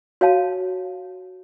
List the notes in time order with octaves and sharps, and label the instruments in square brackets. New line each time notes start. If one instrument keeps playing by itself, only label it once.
[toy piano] F#4 C#5 F5 A5